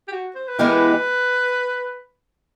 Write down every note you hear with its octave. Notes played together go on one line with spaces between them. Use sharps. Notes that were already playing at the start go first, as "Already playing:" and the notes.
G4
F#4
C5
B4
E3 G#3 B3 E4 G4 A#4
B4